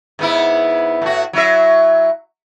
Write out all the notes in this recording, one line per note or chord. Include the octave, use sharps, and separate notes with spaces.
G#2 B3 E4
A2 F#4
F#3 E4 E5